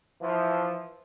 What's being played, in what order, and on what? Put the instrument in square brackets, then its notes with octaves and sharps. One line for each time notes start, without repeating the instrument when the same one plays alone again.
[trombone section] E3 F3